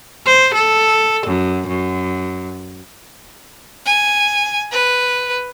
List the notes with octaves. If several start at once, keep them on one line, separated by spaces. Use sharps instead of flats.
C5
A4
F#2
F#2
G#5
B4